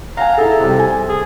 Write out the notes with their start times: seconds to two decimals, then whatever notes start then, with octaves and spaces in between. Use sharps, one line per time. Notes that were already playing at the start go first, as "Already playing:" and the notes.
0.17 F5 F#5 G#5 A#5
0.38 E4 G#4 A4
0.61 C3 G3
0.75 C5 G#5
1.09 G#4